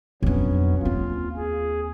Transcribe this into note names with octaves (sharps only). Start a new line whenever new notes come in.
F2 F#3 B3 C#4 D4
D#2 C4 F4
G#4